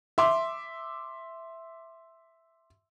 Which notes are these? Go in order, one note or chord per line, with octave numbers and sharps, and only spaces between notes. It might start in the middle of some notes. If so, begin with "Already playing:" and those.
E5 C6 D6